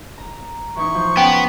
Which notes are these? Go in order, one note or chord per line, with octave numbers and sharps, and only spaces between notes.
A#5
E3 D#4 C#6
F3
B3 C#4 G5 A5 B5